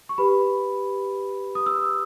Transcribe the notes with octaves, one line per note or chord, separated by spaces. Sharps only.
C#6
G4 B4 B5
D#6
E6